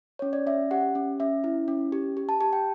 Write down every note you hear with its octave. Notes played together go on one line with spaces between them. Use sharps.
C#4 C#5
D5
C#4 E5
G4 F#5
C#4
C#4 E5
E4
C#4
G4
G4
A5
G4 A5
G5